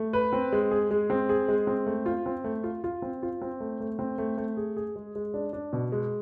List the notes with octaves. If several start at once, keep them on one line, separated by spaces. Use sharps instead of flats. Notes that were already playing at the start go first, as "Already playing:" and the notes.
Already playing: A3
B4
C4
G#3
G#4
G#3
C4
G#4
G#3
C4
A3
F4
C4
A3
F4
F4
C4
F4
C4
A3
A3
C4
A3
A3
G#4
G#4
G#3
G#3
D4
D4
B2
G#3